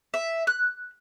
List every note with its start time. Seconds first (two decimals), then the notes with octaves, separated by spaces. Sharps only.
0.14 E5
0.47 F#6